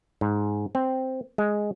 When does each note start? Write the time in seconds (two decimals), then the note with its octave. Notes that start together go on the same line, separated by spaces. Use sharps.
0.21 G#2
0.75 C4
1.38 G#3